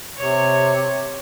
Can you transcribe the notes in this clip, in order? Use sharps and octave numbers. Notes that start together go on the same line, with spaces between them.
C3 C#5